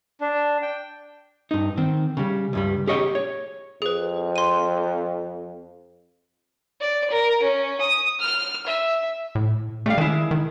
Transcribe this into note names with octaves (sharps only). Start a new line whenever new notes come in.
D4
G5
G2 D#4
D#3 C4
C#3 G3
C#2 G2 G3
G4 G#4 C#5 D#5 F5 G5
C#5
F2 G#4 B4
C6 D#7
D5
A#4
C#4
D#6
F6
E5
A2
G3 A3 F5
D#3 G#3 E4
D#3